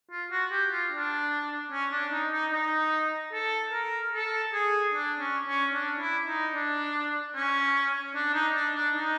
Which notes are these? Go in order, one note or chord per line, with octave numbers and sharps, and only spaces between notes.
F4
F#4
G4
F4
D4
C#4
D4
D#4
D#4
D#4
A4
A#4
A4
G#4
D4
C#4
C#4
D4
E4
D#4
D4
C#4
D4
D#4
D4
D4
D#4